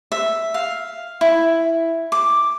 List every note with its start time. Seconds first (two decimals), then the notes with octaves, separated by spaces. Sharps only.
0.12 E5
0.54 F5
1.21 E4
2.12 D6